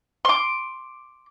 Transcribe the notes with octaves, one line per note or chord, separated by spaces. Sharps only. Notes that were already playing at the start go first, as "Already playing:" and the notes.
C6 D6